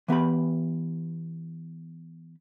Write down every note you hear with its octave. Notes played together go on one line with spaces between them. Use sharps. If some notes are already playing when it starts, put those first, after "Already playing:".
E3 B3 G4 B5